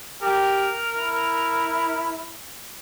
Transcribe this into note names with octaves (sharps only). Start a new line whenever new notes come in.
G4 A#4
E4